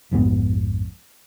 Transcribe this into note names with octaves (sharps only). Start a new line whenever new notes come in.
A#1 F2 G#2 B3